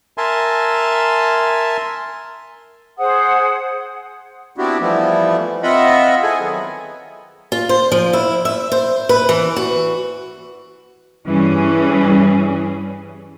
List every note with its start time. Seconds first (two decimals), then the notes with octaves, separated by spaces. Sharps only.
0.18 A#4 E5 G#5 A5 C6
2.97 G#4 C5 F#5 D#6
4.58 B3 C4 D4 E4 F#4 G4
4.80 E3 F3 G3 A3 B3 E4
5.63 C4 F4 D#5 E5 F#5 B5
6.23 E4 G#4 A4 G#5
6.40 D#3 F#3 B3
7.52 F4
7.69 C5
7.92 F3
8.13 E4
8.45 E5
8.72 C5
9.09 B4
9.29 E3
9.56 F#4
11.26 G2 E3 G3 C#4 G#4